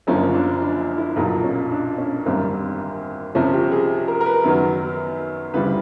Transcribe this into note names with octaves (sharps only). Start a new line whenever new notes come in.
F#1 F#2 D3 F3 A#3 C#4
D4
D4
E4
B1 A#2 F#3 D#4
C#4
D4
C#4
G#1 F#2 D3 G3 A#3 C4
C2 C3 F3 C#4
G4
G#4
A#4
A#4
B4
F#2 D#3 F#3 B3
D2 C#3 E3 G3 B4